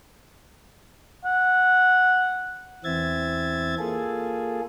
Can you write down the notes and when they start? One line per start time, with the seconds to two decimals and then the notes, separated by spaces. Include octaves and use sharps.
1.25 F#5
2.84 E2 E3 C4 E5 G#6 A6
3.79 A#3 F4 G#4 A4